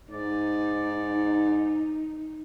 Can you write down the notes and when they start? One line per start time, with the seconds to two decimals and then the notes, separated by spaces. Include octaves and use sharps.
0.11 G#2 D#4 D5